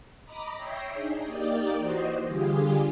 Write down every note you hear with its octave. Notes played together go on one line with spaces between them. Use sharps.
D#5 A#5 B5 D6 D#6
C#5 E5 G5 A#6 C7
D4 D#4 G#4
A#3 D#4 G4 D5
E3 F#4 C5 D#5
D3 G3 F4 G4 G#4